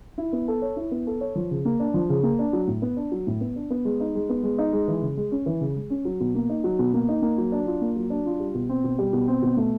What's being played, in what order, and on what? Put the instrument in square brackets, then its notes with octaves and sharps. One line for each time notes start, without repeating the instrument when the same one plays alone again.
[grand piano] E4
B3
A4
C#5
E4
B3
A4
C#5
F3
C#3
A#3
D4
F3
C#3
A#3
D4
F#3
A2
B3
D4
F#3
A2
B3
D4
B3
G#3
D#4
G#3
B3
G#3
D#4
G#3
E3
C#3
G#3
C#4
E3
C#3
G#3
C#4
F#3
B2
A#3
D#4
F#3
B2
A#3
D#4
A#3
F#3
D4
F4
A#3
F#3
D4
F4
G3
B2
C4
B2
G3
B2
C4
B2
A3